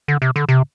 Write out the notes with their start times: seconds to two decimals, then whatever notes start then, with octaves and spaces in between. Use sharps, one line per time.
0.08 D3
0.22 C3
0.36 D3
0.49 C3